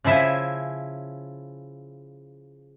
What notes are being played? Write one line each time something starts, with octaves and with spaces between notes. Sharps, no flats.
C#3 F3 E4 E5 G#5